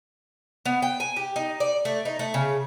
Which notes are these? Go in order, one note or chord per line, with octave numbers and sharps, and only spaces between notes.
B3
G5
G#5
G4
D#4
D5
A3
D#4
A3
C#3